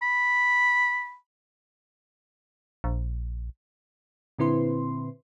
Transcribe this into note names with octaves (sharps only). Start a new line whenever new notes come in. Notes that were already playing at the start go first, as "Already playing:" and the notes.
B5
A#1
A#2 D3 C4 E4 B4 C6